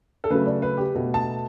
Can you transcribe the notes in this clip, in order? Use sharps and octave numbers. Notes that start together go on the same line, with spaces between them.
A4
C#3 F#3 A3 B4
D5
B4
G4
B2 A3
A5